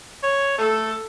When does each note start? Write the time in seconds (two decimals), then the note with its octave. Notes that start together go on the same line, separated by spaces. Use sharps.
0.23 C#5
0.58 A3 A4